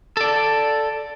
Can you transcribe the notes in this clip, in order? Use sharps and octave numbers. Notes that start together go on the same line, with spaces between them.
A4 D5